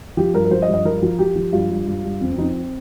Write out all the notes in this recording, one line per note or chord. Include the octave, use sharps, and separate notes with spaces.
F3 G4
G2 A#4
A#4
F3 C5
D#5
G2
D#5
F3 A#4
F3
F3 G4
F3
G2 F4
G2
G2
G2
F2 C4
C4
F3 D#4
C4